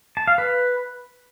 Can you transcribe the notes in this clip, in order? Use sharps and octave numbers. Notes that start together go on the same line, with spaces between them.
A5
F5
B4